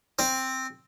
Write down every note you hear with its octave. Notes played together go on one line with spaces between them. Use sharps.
C4